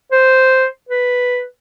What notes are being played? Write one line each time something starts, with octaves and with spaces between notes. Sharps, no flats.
C5
B4